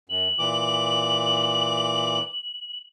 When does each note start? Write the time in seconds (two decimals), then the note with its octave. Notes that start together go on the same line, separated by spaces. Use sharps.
0.09 F#2 F#7
0.39 A#2 E3 D6